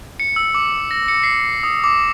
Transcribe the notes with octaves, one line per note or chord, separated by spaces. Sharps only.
C#7
E6
D6
A#6
C#7
C7
D#6
D6